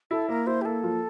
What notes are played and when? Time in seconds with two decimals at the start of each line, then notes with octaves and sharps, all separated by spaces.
0.11 E4 A4
0.29 A#3 A#4
0.47 E4 C5
0.62 G4
0.65 A#3 A4
0.83 F3